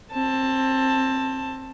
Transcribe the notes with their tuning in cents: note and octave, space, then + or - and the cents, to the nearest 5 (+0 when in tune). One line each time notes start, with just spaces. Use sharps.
C4 +20 A5 +10